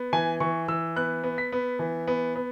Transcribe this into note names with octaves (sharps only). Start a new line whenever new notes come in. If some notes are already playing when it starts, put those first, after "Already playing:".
Already playing: B3
E3 G#5
E3 C#6
E3 E6
B3 F#6
B3
B6
B3
E3
B3
B3